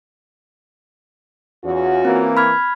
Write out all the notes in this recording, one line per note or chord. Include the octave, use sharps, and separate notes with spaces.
E2 C#4 F4 F#4
E3 A#3 C4
B5 F6 G#6